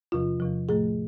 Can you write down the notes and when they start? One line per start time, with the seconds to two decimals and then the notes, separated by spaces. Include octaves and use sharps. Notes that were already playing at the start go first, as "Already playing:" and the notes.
0.12 E2 C3 F3 F4
0.40 E2 C3 F3
0.69 A2 F3 A3 G#4